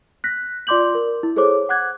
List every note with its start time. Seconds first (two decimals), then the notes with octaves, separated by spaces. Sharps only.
0.24 F#6 A#6 B6
0.67 F4 D5 C6 D6 G6 F#7
0.95 A#4
1.23 E4
1.36 G#4 A4 C5 C#5 D6
1.69 F#5 D6 F#6 G#6